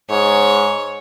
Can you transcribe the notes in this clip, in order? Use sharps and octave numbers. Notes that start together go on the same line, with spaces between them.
G#2 C#5